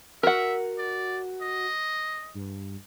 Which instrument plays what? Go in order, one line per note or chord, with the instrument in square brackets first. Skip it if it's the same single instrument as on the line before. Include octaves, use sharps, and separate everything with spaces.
[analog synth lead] F#4 [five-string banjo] A#4 F#5 [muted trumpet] E5
[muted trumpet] D5
D#5
[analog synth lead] G2